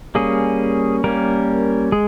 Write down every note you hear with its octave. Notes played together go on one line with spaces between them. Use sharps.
G3 A#3 C#4 G#4
G3 A#3 C#4 A#4
G#3 G#4